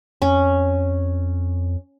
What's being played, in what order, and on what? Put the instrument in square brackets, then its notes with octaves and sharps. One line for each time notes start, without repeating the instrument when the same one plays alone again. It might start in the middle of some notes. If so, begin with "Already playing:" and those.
[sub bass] F2 [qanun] C#4